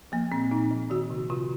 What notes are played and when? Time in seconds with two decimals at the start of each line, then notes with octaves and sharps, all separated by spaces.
0.12 F3 A#3
0.32 A#2 C4
0.51 A#2 D#4
0.71 F3
0.90 D#3 F#4
1.10 C3
1.30 C3 F4